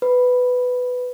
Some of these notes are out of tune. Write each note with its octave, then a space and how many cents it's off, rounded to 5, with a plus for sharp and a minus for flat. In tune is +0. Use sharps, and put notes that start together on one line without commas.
B4 +10 B5 +0